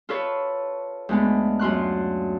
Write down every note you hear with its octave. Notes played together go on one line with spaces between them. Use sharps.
F4 A4 B4 C#5
D2 G#3 B3
F#2 F4 C6 F#6